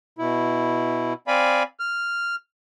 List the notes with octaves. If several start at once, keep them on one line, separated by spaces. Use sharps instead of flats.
B2 E4
C4 D5 F5 G#5 B5
F6